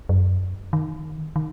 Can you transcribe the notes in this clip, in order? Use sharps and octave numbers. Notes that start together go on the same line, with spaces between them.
F#2
D#3
D#3